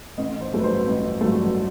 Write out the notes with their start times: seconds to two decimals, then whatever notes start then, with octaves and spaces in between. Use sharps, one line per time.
0.18 A1 D#5
0.41 C5
0.53 G2 F#3 A3
0.59 B4
0.64 C5
0.87 A1
1.21 G2 F#3 A3